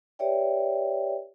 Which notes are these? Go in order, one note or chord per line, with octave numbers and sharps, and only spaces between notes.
G4 B4 C#5 D5 E5 G5